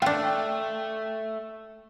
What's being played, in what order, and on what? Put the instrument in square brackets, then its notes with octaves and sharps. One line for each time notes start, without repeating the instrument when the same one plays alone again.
[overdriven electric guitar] A3 [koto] D4 F4 [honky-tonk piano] G5